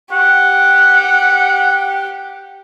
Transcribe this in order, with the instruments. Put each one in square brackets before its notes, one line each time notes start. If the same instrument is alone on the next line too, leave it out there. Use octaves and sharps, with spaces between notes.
[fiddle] G4 [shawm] F#5